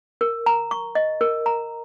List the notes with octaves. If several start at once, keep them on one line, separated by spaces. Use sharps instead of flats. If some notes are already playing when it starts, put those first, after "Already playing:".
A#4
A#5
C#6
D#5
A#4
A#5